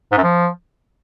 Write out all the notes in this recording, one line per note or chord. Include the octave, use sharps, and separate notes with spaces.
G#2
F#2
F3